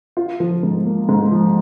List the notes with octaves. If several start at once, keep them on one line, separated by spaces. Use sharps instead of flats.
F4
F3
G#2
A#3
G#2
F3